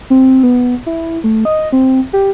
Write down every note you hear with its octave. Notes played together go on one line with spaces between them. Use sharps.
C4
B3
E4
A3
D#5
C4
G4